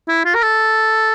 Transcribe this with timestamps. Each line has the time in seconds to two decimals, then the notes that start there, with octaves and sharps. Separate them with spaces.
0.08 E4
0.25 F4
0.35 A#4
0.42 A4